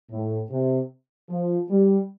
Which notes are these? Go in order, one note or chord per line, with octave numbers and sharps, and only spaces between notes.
A2
C3
F3
G3